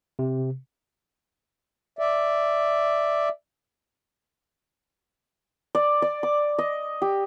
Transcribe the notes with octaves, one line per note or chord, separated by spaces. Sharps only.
C3
D5 E5
D5
D5
D6
D#5
G4